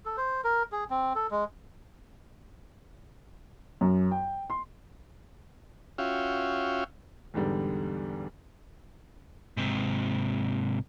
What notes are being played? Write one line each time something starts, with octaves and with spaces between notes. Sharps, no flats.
A4
C5
A#4
G#4
C4
A4
G#3
F#2
G5
C6
C#4 F4 F#4 E5 F5 G5
E2 G#2 D3 G3
G#2 C3